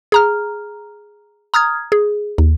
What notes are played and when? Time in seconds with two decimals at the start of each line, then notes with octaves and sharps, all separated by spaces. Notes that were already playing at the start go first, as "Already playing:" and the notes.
0.12 G#4 A#5 F6
1.54 A#5 D#6 F6 G#6
1.92 G#4
2.38 D#2